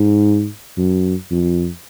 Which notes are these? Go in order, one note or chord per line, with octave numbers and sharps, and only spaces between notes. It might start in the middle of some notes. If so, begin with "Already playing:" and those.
Already playing: G#2
F#2
F2